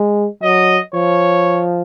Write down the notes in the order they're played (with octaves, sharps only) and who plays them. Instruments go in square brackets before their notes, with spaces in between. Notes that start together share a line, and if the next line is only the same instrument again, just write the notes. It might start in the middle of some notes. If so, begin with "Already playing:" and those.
Already playing: [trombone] G#3
[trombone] F#3 [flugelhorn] D#5
[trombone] F3 [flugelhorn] C#5